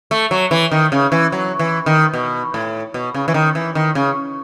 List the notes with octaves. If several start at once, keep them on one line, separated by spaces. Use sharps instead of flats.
A3
F#3
E3
D#3
C#3
E3
F#3
E3
D#3
B2
A2
B2
C#3
E3
D#3
E3
D#3
C#3